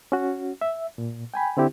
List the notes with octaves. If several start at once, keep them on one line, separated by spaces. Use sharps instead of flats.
C#4 F#4
E5
A#2
G5 G#5 B5
D3 C4 E4 G4